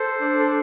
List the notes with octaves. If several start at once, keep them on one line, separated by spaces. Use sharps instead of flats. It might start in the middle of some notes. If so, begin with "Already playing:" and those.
Already playing: A4 C5
D4
A4